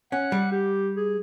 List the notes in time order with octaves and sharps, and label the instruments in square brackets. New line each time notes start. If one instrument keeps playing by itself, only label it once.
[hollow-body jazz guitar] C#4 [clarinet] F#5
[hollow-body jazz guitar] G3
[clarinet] G4
G#4